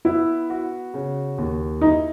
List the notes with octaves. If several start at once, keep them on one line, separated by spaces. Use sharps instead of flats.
B3 E4
F#4
C#3
D#2
D#4 E4